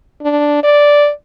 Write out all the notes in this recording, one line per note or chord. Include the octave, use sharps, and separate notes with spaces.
D4
D5